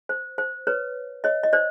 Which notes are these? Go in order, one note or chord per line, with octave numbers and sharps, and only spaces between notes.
C5
C5
B4 C#5
C#5 D#5
D#5
C5 D5